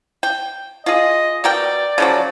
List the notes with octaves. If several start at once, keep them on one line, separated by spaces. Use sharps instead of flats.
G5
F4 G#4 D#5
B2 A#4 D5 G5
C#3 F3 F#3